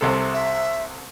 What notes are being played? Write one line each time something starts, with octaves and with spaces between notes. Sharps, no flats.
C2 C3 A4
E5